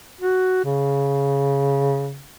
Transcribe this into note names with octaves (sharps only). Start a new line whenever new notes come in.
F#4
C#3